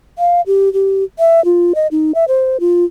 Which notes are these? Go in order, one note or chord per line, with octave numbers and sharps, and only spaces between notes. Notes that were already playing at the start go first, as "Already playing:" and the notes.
F5
G4
G4
E5
F4
D#5
D#4
E5
C5
F4